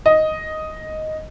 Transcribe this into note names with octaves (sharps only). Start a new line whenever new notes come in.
D#5